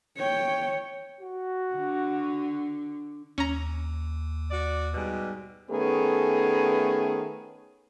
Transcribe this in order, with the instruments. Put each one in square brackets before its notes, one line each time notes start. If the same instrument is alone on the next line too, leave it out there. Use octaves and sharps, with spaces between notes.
[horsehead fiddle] C#5 G5
[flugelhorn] F#4
[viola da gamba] D3
[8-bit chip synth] D#2 [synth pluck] C#4 A#5
[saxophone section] F#4 D5
G#2 B2 G3
[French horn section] D#3 A3 B3 C#4 G#4 A4